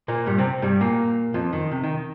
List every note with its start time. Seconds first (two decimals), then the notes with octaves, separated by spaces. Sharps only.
0.08 A#2 A#3
0.26 G2 G3
0.38 C3 C4
0.62 G2 G3
0.81 A#2 A#3
1.34 F2 F3
1.53 D#3
1.71 C3
1.83 D#3